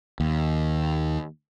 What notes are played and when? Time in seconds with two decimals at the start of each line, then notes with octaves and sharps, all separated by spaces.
0.20 D#2